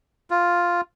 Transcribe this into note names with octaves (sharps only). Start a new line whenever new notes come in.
F4